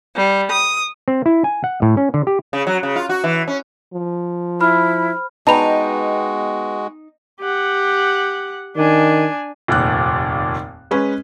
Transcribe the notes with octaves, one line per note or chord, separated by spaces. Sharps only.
G3
D#6
C4
E4
G#5
F#5
A2
C#4
D3
G4
C#3
F#3
C#3
F4
F#4
E3
C#4
F3
E4 C5 B5 F6
G#3 B3 D#4 F#4 G5 A5 B5 F7
G4 F#5
D#3 D4 G#5
F1 D#2 A#2 F#6
G#3 C#4 B4